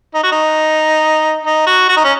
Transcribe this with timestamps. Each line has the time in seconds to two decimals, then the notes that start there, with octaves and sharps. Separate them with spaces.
0.14 D#4
0.23 F#4
0.32 D#4
1.45 D#4
1.67 F#4
1.89 F#4
1.96 D#4
2.04 C#4